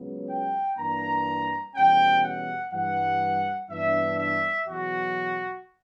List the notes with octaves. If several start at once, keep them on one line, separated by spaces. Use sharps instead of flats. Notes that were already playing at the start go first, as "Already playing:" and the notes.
Already playing: C#2 C#3 F#3 B3
G5
G2 E3 A#3 D4 A#5
E2 B2 G3 C#4 G5
F#5
G2 E3 G3 F#5
G2 E3 B3 D4 E5
E5
E2 B2 F#3 F#4